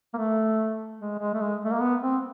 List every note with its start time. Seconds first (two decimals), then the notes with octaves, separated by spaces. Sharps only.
0.14 A#3
0.18 A3
1.00 G#3
1.19 G#3
1.34 A3
1.40 G#3
1.65 A3
1.73 A#3
1.81 B3
2.02 C4